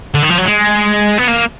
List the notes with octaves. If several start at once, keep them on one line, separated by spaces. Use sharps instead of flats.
D3
D#3
F3
F#3
G#3
B3
A#3